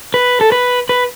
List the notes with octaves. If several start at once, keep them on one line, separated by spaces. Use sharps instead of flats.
B4
A4
B4
B4